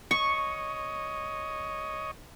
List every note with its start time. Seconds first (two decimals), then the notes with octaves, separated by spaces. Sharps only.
0.11 C#5 D#5 C#6